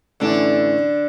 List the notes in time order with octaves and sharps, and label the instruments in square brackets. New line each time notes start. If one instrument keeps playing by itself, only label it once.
[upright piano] A2 E3 A3 C#4 E4 [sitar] D3 D4